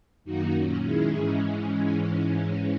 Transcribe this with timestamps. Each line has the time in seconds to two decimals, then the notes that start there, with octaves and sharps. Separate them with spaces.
0.24 F#2 D#3 A#3 D#4 F#4
0.54 A#2 F#3 C#4
0.84 D#3 G#3 C#4 E4 G#4
1.15 G#2 E3 G#3 C#4